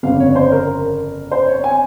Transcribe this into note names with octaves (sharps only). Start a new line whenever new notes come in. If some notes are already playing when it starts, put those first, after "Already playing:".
G1 F2 C#3 F5
C#5
C5
A#4
C5
C#5
G#5